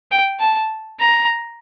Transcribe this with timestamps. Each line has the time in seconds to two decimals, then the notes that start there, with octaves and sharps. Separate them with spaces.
0.11 G5
0.40 A5
1.00 A#5